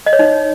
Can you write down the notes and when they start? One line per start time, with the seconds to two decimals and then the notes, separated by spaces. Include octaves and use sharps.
0.06 D#5
0.13 C#5
0.19 D#4